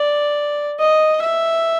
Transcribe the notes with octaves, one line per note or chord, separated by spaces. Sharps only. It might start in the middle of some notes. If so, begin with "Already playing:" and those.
Already playing: D5
D#5
E5